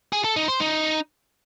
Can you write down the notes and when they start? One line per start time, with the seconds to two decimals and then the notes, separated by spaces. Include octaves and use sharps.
0.13 G#4
0.24 A4
0.36 D#4
0.48 C5
0.60 D#4